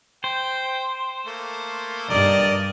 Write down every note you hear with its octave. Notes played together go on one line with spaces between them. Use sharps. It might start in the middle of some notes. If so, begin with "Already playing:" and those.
C5 G5
A3 A#3
G2 A#4 D5 D#5